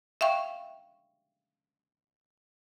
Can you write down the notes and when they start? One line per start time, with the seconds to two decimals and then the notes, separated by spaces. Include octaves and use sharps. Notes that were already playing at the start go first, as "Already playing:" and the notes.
0.21 E5 F5 G5 C#6